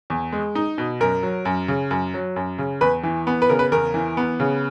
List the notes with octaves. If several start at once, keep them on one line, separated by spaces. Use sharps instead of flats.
E2
G#3
D#4
B2
F#2 A#4
F#3
F#2
C#3
F#2
F#3
F#2
C#3
E2 B4
E3
B3
B4
C#3 A#4
B4
E2 A#4
E3
B3
C#3